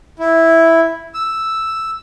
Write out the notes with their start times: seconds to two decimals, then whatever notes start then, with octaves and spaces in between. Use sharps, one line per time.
0.19 E4
1.14 E6